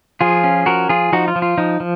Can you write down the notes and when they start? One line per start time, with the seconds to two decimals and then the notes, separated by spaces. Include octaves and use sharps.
0.21 F3 F4 G#4
0.44 C#4
0.66 F3 F#4 A#4
0.89 F3 F4 G#4
1.12 F3 D#4 F#4
1.28 F4
1.36 F3
1.42 F4
1.58 F3 D#4
1.80 F3